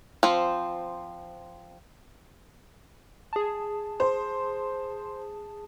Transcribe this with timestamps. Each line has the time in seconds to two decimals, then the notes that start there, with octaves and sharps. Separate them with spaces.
0.23 F3 C4
3.33 G#4 A5
4.00 C5